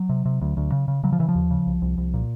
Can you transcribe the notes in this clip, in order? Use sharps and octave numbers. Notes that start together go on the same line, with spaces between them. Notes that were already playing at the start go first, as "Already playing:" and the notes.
Already playing: F#3
C3
C3
D2
D2
C#3
C#3
C#3 F#3
F3
C#3 E3
F3
D#2
C#3
C2
C2
C2
A#2